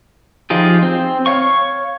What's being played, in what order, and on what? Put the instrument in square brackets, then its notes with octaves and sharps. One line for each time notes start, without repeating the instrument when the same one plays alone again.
[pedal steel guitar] F3 D#4 F4 G4 G#4
C4
C#5 F5 C#6